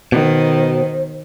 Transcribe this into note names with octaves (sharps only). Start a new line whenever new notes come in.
B2 D#3 C5